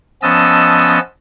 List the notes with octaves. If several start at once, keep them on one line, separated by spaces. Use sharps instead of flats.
F3 B3 C#4 D#5 A5 E6